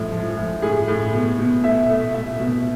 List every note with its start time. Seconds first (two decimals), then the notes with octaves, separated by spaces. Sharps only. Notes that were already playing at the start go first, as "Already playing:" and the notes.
Already playing: A2 F3 G#3
0.12 F3
0.37 A2
0.62 A2 G#4
0.88 A2
1.14 B2
1.39 B2
1.64 A3 E5
1.90 A3
2.14 A3 E5
2.40 B2